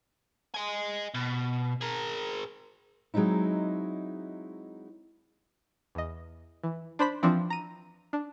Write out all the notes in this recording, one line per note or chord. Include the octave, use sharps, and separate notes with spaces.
D#5 G#5
B2
G#4 A#4
F#3 G#3 C4 D#4 E4
E2 D#5
E3
D4 C5 B5 B6
E3 F3 C4 D4
A#5 D#7
D4